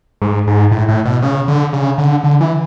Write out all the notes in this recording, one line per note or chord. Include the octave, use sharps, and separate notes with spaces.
G#2
G#2
A2
A2
B2
C#3
D3
C#3
D3
D3
E3